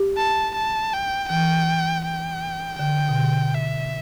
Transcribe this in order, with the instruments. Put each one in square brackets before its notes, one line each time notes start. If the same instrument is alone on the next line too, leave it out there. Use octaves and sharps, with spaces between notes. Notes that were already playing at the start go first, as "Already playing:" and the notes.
Already playing: [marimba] G4
[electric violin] A5
A5
G5
[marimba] E3 [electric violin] G5
[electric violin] G5
[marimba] D3 [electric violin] G5
[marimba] B2
D3
[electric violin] E5